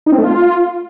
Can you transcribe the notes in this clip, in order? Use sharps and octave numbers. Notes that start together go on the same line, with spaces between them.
D#4
C4
A3
F4